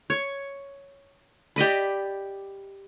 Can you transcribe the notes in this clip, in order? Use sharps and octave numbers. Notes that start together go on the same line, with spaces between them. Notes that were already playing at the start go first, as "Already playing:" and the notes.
C#5
G4 D5 D#5 B5